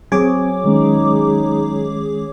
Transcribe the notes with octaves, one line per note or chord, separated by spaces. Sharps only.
F#3 C4 G#4 C#5 D6 G#6
D#3 G#3 C#4 D#4